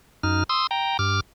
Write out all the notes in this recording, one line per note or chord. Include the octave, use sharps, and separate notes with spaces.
F#2 D#4 F6
C6 D#6 E6
G5 A#5
G2 D6 F6